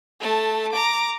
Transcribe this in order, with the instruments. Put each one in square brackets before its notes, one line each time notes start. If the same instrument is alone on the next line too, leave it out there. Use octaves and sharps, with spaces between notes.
[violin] A3 A5
A#5 D6